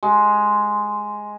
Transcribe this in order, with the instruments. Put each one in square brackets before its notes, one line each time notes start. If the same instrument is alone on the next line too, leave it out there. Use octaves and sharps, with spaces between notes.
[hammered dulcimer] G#3